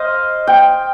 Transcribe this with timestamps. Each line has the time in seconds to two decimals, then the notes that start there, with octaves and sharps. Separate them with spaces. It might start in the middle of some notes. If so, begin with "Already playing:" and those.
Already playing: C5 D#5 F5
0.47 G5